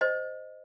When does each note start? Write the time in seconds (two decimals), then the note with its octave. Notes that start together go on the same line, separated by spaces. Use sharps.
0.01 C5 D#5